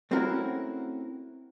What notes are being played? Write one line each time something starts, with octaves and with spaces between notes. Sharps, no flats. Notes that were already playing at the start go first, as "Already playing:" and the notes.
A3 C4 C#4 E4 F#4 A#4